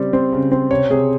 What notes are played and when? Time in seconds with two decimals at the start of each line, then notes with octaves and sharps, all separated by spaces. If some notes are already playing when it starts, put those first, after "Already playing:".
Already playing: C#3 G3 C4
0.13 C4
0.32 C#3
0.51 C4
0.70 C3 C#5
0.90 C3 G#4